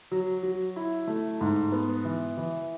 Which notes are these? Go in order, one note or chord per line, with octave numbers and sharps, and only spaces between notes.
F#3
F#3
E4
A3
G#2
B3
E3
E3